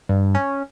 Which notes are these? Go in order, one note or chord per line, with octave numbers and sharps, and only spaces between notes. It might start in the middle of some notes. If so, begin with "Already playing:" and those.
G2
C#4